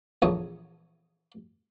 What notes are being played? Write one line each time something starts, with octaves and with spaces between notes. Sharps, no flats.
A#1 E2 A3 C#5 D#6